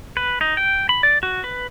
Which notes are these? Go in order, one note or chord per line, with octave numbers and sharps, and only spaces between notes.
B4
D#4
G5
B5
D5
F#4
B4